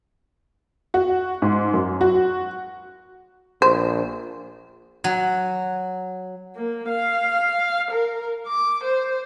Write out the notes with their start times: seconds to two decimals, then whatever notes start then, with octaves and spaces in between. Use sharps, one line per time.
0.94 F#4
1.42 G#2
1.74 F#2
2.01 F#4
3.62 A#1 C5
5.04 F#3
6.56 A#3
6.88 F5
7.91 A#4
8.47 D6
8.84 C5